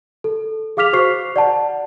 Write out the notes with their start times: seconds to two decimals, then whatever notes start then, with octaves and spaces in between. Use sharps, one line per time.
0.24 A4
0.77 G#4 F5 D6 F6 B6 F7
0.93 F#4 C5 C#6 F#6 C7
1.36 D5 F#5 A5